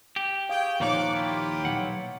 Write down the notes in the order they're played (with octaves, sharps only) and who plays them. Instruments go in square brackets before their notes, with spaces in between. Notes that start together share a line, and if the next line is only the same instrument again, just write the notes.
[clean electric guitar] G4
[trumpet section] G#4 G5 [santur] F5 C#6 D#6
[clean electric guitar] D#2 A#2 F3 [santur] D#4 C#5 [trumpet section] D5 F#5 D6
[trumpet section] E4 F4 G4
[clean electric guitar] B1 E3 F#5 [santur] E6